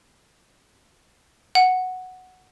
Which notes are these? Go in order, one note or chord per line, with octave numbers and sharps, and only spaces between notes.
F#5